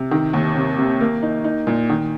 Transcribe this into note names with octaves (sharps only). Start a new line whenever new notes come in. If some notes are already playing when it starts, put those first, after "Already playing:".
Already playing: C3
D#3
D#2
C3
C3
A#3
D#4
D#4
A#2
D#3